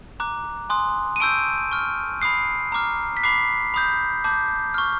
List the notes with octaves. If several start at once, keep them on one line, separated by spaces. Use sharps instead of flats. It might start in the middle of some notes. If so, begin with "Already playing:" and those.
A#5 D6 F#6
G#5 C6 D#6 F#6
D#7
A5 C#6 E6 G6 D7
C#6 F6
B5 D#6 F#6 C7
A#5 D6 F6
B6
B5 D6 F#6 C7
B5 D#6 G6
A5 D6 G6
C#6 F6